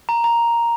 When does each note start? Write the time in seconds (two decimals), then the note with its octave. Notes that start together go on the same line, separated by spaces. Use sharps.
0.09 A#5
0.24 A#5